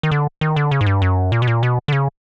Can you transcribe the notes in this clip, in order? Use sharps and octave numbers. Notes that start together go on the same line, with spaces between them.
D#3
D3
D#3
D3
C#3
G#2
G2
F#2
A#2
B2
A#2
B2
D3
C#3